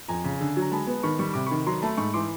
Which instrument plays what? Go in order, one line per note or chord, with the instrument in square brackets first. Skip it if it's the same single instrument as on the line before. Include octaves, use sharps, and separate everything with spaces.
[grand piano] F2 [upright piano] G#5 A#5
[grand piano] C#3
D3
F#3
[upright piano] A#5
[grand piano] G#3 [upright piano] A5 B5
[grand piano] B3
[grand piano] D#3 [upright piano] B5 C#6
[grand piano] G3 [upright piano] C#6
[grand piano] C3 [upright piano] D6
[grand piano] D#3 [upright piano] B5 C#6
[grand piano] F#3 [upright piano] A#5 C6
[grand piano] A3 [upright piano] A5 B5
[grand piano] G#2 [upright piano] B5 C#6
[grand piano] E3 [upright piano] C6 D6